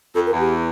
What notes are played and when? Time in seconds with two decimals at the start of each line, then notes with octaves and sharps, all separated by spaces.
0.14 F2 A4
0.27 A#4
0.33 E2
0.39 G4